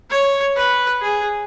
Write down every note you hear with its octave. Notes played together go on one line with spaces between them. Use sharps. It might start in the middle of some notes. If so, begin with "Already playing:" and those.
C#5
B4
G#4